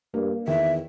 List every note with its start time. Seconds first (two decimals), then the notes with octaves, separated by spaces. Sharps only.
0.14 G2 A#3
0.48 E2 D#3 E5